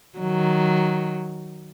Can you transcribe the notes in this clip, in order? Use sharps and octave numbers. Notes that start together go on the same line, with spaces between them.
D#3 F#3